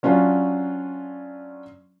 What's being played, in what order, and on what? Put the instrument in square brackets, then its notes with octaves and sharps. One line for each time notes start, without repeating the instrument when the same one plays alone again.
[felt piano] F#3 C#4 D4 F4